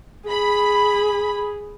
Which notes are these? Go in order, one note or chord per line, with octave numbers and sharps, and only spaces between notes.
G#4 B5